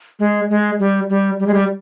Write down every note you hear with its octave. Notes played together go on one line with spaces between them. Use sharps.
G#3
G#3
G3
G3
G3
G#3
G3